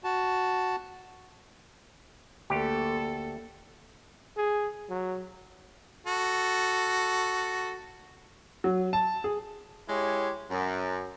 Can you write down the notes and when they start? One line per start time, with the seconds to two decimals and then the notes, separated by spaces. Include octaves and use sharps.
0.04 F#4 A5
2.50 D2 A#3 G4 A4
4.37 G#4
4.89 F#3
6.07 F#4 A4
8.64 F#3
8.93 A5
9.24 G#4
9.88 G#3 E4 G4 C#5
10.50 F#2